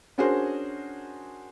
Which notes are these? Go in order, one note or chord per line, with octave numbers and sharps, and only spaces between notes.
C#4 D4 F#4 G#4 A#4 C5